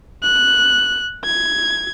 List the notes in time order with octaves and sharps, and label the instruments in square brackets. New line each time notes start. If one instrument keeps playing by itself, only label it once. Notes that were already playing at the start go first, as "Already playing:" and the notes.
[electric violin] F#6
G#6